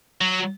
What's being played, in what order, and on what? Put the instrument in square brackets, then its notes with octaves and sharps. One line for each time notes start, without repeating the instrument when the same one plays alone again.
[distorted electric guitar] F#3